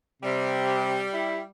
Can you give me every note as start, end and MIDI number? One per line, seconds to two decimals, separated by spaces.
0.22 1.04 48
0.22 1.43 55
1.13 1.39 64